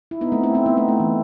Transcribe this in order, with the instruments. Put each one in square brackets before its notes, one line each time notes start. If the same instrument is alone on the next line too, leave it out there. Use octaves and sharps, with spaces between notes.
[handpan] E4
B3 D#4
A3 C4
C4 E4
C4 E4
B3 D#4
A3 C4
A3
E3